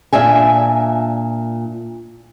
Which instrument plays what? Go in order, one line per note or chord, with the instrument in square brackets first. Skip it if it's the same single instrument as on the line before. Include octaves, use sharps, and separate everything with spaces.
[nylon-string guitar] A#2 D4 E5 G#5